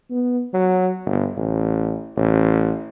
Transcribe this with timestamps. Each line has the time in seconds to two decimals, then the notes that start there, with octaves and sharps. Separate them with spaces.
0.10 B3
0.53 F#3
1.05 G1
1.37 A1
2.17 A1